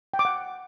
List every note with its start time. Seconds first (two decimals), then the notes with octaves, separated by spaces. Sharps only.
0.14 G5
0.19 D6
0.25 F#5